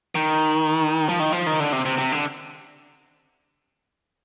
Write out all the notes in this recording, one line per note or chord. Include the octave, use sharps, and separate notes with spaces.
D#3
F3
D#3
F3
D#3
D3
C3
C3
C3
D3